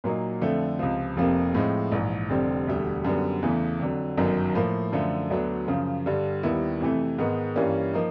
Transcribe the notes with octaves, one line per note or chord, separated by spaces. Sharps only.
A#2 F#3 A#3 D#4
F2 D3 F3 A3
C#2 C3 F3
F1 F2 C3 F3 A#3
A2 F3 G#3 C4
A#1 G#2 E3
F1 F2 D3 G3 C4
E1 D2 D3 G3
F#2 D3 G3 B3
E2 C#3 E3 A3
F2 D3 F#3
G1 F#2 D#3 F#3
A2 F3 A#3
F#2 D3 F3 A3
D2 D3 F#3 B3 D4
F#2 C#3 F3
G2 D3 G3
D#2 D#3 G3 B3 E4
F2 C3 E3 A3
G#2 D#3 G#3 B3
G2 E3 G3 A#3 C#4
F3 A#3 D#4